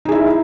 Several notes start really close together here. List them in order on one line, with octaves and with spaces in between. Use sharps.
D#4 G#4 E4 E5